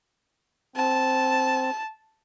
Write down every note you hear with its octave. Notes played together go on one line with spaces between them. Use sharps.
C4 A5